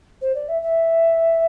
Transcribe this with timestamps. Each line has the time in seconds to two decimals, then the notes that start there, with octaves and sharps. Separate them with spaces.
0.21 C5
0.35 D5
0.48 E5
0.62 E5